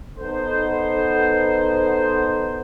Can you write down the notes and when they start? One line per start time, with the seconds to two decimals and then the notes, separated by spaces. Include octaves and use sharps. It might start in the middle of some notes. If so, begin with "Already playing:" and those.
0.18 B3 D#4 A4 C5